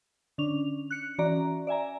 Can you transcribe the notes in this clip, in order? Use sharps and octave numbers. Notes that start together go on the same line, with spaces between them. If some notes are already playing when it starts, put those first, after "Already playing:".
D3 C#4 D4 F7
F#6 C#7
E3 C#4 F#4 D5 A#5
D5 E5 G#5 A#5